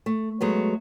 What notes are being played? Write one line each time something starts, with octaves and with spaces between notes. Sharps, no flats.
A3
F#3 G#3 A3 B3